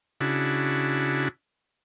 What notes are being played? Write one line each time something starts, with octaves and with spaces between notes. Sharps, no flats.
C#3 D4 E4 F#4